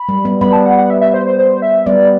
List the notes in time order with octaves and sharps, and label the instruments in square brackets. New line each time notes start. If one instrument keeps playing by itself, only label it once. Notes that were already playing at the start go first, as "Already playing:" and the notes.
Already playing: [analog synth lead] B5
[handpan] G3
G3 B3
[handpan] G3 B3 [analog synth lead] B5
[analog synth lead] A5
F#5
F#5
E5
E5
C5
C5
C5
E5
[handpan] G3 B3 [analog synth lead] D5